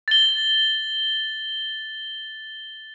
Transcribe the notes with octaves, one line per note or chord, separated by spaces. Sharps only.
A6 G7